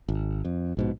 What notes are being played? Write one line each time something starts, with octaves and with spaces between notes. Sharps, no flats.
G#1
F2
A#1 G#2 B2